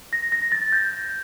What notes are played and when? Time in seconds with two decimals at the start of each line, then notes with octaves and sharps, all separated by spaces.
0.13 A#6
0.32 A#6
0.52 A6
0.72 G6